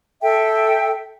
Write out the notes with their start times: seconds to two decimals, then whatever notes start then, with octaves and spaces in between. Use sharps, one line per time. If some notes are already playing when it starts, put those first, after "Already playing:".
0.21 A4 E5 G5